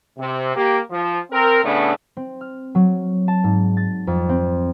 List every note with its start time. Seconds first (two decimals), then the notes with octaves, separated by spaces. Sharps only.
0.18 C3
0.55 A#3 G4
0.90 F3
1.31 C4 A#4
1.63 A2 C#3 A3 B3 D4
2.17 C4
2.41 F6
2.75 F#3
3.28 A5
3.44 G#2
3.77 A6
4.07 F2
4.29 C4